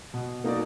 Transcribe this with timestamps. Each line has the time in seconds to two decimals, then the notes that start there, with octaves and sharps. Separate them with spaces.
0.14 B2
0.44 A#3 D#4 F#4 D5